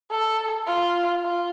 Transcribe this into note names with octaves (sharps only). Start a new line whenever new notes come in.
A4
F4
F4